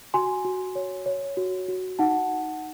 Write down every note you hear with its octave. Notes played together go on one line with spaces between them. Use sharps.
F#4 G#5 C6
F#4
C#5
C#5
F#4
F#4
D#4 F#5 A5